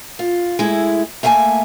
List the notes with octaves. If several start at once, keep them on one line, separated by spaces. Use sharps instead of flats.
F4
G#3 A3 E4
A3 A#3 E5 F5 G#5 A5